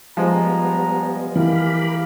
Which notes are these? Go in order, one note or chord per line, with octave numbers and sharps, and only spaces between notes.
F3 G3 G#3 B3 A#5
E3 G4 A#4 F5 B5